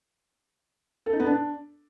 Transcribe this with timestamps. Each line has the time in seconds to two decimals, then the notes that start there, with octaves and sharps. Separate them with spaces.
1.06 A4
1.13 D#4
1.20 B3
1.26 D4